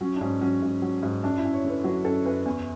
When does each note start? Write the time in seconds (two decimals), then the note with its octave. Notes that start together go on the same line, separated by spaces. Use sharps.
0.01 F#3 C#4
0.16 D4
0.21 G#2 C#4
0.41 F#3 C#4
0.62 G#2
0.82 F#3
1.03 G#2
1.23 F#2 D4
1.38 E4
1.44 F#2
1.53 C#5
1.65 D3 B4
1.84 F#3 B4
2.05 F#2 A4
2.25 F#2 B4
2.46 E2